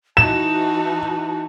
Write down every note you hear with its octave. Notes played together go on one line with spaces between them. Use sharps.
E3 D#4 F#4 A5 E7